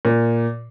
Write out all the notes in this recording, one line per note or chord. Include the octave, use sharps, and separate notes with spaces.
A#2